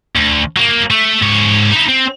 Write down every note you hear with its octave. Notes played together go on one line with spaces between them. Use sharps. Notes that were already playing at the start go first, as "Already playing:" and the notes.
D2
F#3 A#3
A3
G#2 C#5
D#4 E4
C4